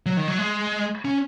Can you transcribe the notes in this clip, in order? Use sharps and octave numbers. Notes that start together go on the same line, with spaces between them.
F#3
D#3
F#3
G#3
C#4